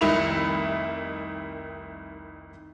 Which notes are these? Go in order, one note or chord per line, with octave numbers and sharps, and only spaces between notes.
F1 C2 D#3 E4 B5 F7